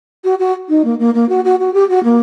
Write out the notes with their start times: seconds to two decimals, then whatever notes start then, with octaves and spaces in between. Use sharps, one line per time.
0.24 F#4
0.39 F#4
0.69 D#4
0.84 A#3
0.99 A#3
1.14 A#3
1.29 F#4
1.44 F#4
1.59 F#4
1.74 G4
1.89 F#4
2.03 A#3